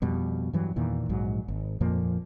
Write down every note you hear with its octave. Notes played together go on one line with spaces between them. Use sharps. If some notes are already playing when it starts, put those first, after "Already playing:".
F2 B2 G3
G2 E3 F#3
E2 A#2 D#3 E3
A#1 G#2 F#3
G#1
F2 A#2 F3 A#3